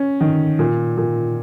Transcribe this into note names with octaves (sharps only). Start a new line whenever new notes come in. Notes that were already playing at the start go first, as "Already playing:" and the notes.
Already playing: C#4
D#3
A#2
A#2